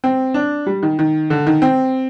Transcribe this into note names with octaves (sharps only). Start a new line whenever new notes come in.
C4
D4
G3
D#3
D#3
D3
D#3
C4